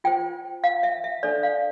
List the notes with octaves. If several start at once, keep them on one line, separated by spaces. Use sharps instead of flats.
F4 C5 G5
F5
E5
E5
D4 A4 C5 D5
F5